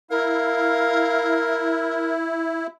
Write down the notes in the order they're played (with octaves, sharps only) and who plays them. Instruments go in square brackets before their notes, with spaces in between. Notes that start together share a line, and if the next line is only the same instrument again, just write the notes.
[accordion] E4 [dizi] A#4 [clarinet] F5